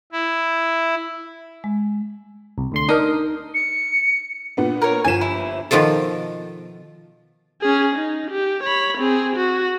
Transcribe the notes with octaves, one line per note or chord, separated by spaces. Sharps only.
E4
G#3
C2
D2 D3 C6
D4 D#4 A#4 D#5 D#6
C#7
A#2 B3 D4
A#4 C#5
G1 F3 G#5 E7
E4
B2 D#3 F3 F4 A4
C#4 G#4
D#4
G4
C#5 B5
C4 G#4
F#4